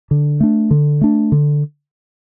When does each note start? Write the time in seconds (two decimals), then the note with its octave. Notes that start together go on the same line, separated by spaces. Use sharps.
0.11 D3
0.40 A3 D4
0.71 D3
1.01 A3 D4
1.32 D3